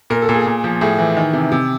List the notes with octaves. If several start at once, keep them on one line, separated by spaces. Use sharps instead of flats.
A#2 A#4
A4
A#2
G#4
A#2
F3
A2 G#4
E3
D#3
C3
C3